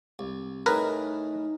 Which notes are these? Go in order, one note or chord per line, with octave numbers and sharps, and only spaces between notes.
C2
A2 A3 D#4 G#4 A#4 B4